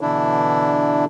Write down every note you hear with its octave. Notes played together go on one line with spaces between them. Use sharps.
B2 D3 E3 D4 E4